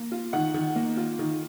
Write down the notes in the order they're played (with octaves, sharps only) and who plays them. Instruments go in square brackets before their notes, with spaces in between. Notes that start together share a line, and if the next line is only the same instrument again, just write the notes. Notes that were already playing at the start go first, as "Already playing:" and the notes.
Already playing: [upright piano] A#3
F4
D#3 F#5
D#3
A#3
F4
D#3